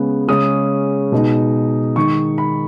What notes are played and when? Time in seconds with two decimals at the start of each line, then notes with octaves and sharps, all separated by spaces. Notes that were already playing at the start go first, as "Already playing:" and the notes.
Already playing: C#3 G#3 B3
0.28 C#3 G#3 C#4 D#6
1.12 B2 G#3 D#4
1.96 D#3 G#3 D#4 C#6
2.38 B5